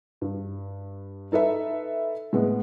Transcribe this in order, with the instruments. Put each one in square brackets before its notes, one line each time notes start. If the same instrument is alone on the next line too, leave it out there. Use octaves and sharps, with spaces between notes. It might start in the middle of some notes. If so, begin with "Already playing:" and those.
[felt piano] G2
D#4 A4 B4 E5
A2 G#3 B3